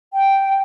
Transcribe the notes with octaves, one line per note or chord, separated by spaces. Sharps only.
G5